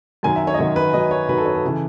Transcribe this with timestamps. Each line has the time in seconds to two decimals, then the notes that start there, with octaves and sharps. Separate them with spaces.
0.23 F#2 D#3 F#3 G#5
0.36 E5
0.47 C#5
0.54 D#5
0.58 F#2 D#3 F#3 C#5
0.76 B4
0.93 F#2 D#3 F#3 D#5
1.11 C#5
1.29 F#2 D#3 F#3 B4
1.38 A4
1.46 C#5
1.55 A4
1.65 C#3 E3